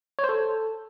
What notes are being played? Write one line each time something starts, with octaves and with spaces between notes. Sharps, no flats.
C#5
C5
A4